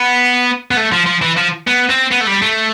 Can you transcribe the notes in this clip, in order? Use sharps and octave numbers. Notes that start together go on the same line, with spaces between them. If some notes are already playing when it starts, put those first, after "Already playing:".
Already playing: B3
B3
A3
F3
F3
E3
F3
B3
C4
B3
A3
G3
A3